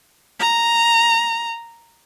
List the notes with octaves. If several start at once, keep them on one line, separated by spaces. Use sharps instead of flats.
A#5